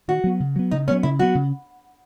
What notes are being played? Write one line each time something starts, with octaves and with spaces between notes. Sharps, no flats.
D#3 F#4
F#3 B3
C#3
F#3 B3
C#3 D#4
F#3 B3 C#4
C#3 E4
F#3 B3 F#4
C#3